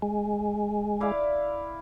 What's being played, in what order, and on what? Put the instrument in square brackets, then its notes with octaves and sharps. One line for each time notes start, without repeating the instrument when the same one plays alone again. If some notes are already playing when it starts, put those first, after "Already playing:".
[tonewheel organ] G#3
[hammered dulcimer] E4 D5 F5